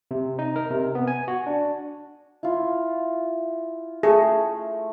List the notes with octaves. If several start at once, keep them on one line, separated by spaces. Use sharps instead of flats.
C3
D#4
A#4
C3
B3
G#5
F#4
D4
E4 F4
A3 G#4